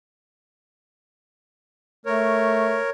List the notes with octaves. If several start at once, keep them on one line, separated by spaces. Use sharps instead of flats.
A3 A#4 C#5